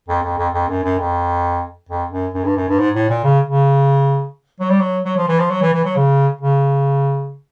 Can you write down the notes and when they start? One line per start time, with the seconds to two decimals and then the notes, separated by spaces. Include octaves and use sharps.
0.08 F2
0.23 F2
0.38 F2
0.53 F2
0.68 F#2
0.84 F#2
0.99 F2
1.89 F2
2.11 F#2
2.34 F#2
2.45 G2
2.56 F#2
2.68 G2
2.79 G#2
2.95 A2
3.09 A#2
3.24 C#3
3.47 C#3
4.60 F#3
4.70 G3
4.80 F#3
5.05 F#3
5.17 F3
5.28 E3
5.39 F3
5.50 F#3
5.62 E3
5.73 E3
5.85 F#3
5.96 C#3
6.41 C#3